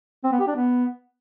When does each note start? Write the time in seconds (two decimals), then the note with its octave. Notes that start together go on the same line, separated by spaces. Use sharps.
0.24 C4
0.32 B3
0.40 G4
0.48 D4
0.56 B3